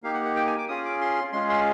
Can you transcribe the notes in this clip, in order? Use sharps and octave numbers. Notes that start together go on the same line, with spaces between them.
A#3 D#4 G4 F5
F#5
F#5
G5
G#5
D6
C#4 F4 G#4 D#6
D6
C6
G#3 C#4 F4 G#4 C6
C6